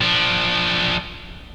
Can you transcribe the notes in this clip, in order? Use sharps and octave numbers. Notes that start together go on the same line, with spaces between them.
F3 D4